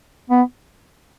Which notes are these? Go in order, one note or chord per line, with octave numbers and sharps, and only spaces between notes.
B3